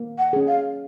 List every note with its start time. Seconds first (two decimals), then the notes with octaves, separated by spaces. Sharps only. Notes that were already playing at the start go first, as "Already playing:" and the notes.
Already playing: A#3
0.18 F#5
0.33 C#4 G#4
0.48 F5